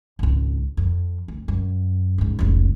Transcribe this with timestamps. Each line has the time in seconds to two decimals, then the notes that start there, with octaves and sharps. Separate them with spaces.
0.19 G#1 C#2
0.77 F2
1.28 D2
1.48 F#2
2.18 G#2 C#3
2.39 F1 C#2